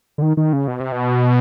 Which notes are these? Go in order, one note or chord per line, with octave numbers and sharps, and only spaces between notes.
D3
D#3
D#3
C#3
B2
C3
B2